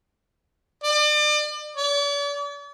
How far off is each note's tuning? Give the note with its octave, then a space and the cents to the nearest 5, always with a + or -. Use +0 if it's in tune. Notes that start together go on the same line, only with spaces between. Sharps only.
D5 +35
D5 -45